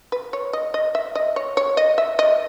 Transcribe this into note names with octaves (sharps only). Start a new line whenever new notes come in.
B4
C#5
D#5
D#5
E5
D#5
C#5
C#5
D#5
E5
D#5